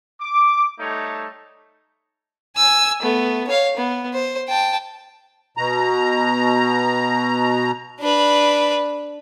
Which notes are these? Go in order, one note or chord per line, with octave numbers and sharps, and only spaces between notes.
D6
G3 A3 D#4 C#5 A5
G#5 E6
A3 B3
C#5 F5
B3
C5
G5 A5
B2 A#5
D4 B4